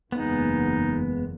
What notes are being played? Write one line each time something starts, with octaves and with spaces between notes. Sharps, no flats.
F#1 E2 G#3 A#3 B3 D#4